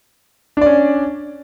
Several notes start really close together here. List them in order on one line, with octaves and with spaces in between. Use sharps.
D4 D5 C#4